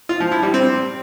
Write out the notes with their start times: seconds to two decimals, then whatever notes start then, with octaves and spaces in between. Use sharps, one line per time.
0.09 F4
0.20 F3
0.32 E4
0.43 G3
0.54 C4